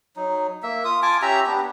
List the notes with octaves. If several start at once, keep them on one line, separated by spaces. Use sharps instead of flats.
F#3 D#4
A#3 E5
F4 D#6
F4 G#5 A5 D6
C#4 G4 E5 A#5
B3 D4 G4